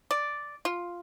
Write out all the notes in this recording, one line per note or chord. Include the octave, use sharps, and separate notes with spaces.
D5
F4